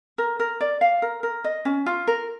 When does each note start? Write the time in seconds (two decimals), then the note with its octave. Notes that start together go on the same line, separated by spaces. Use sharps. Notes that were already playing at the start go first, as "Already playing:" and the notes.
0.18 A#4
0.40 A#4
0.61 D5
0.81 F5
1.02 A#4
1.23 A#4
1.44 D#5
1.65 C#4
1.86 F4
2.07 A#4